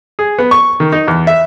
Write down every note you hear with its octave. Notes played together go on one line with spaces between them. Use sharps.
G#4
B3
C#6
D#3
D#4
E2
E5